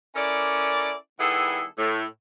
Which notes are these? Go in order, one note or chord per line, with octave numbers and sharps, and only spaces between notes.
C#4 E4 A4 A#4 D5
D#3 G3 B3 E4 G#4 A4
A2